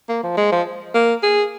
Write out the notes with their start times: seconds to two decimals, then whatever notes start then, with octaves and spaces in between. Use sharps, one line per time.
0.09 A#3
0.23 F3
0.37 G#3
0.52 F3
0.94 A#3
1.23 G#4